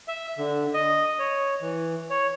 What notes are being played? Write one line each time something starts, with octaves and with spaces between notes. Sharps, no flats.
E5
D3
D#5
C#5
E3
C#5